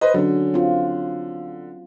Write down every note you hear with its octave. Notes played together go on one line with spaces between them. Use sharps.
B4 C5 D#5
D3 F#3 C#4
C4 F4